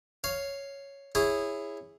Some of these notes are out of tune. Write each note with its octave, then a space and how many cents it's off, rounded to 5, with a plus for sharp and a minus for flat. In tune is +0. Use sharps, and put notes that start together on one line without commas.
C#5 +0 F5 +0
E4 +0 G#4 -15 C#5 +0